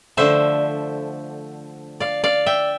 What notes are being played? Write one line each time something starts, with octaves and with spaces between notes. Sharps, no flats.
D3 F3 A3 C5 E5
D5 F5
D5 F5
E5 G5